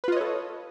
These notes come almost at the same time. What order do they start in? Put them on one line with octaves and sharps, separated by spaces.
B4 F4 D#5 C#5 A4